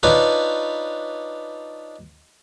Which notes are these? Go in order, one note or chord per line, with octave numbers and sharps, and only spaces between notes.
D4 D#4 F4 B4 C#5